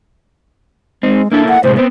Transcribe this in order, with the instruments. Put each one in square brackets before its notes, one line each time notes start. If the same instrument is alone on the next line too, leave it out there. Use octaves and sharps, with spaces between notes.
[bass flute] G#3 [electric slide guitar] C4 D#4
[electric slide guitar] A#3 E4 A4 [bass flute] D4
[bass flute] F#5
[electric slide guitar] A2 C3 G#3 [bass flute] C5
[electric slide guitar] B3 C4 [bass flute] C5